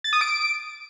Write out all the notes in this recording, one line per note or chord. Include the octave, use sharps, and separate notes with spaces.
A6
D#6
D7